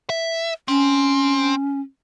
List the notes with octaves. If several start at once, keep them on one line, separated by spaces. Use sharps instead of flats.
E5
C4 C#4